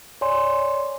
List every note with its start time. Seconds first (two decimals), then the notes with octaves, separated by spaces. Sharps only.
0.21 C#5 D5 G#5 C6